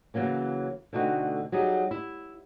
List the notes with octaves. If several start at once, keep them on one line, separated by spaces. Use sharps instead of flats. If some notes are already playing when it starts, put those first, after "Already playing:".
C#3 E3 F#3 A#3 C#4
B2 D3 A3 C4 D#4 F#4
F#3 G3 D#4 G#4
E4